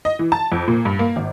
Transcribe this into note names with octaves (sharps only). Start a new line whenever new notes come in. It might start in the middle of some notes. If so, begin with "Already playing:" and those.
D#5
E3
A5
F2
A#2
G2
A#3
G#1